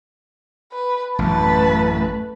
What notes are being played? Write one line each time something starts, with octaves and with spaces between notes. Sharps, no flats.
B4
A1 F#2 A3 B4 A5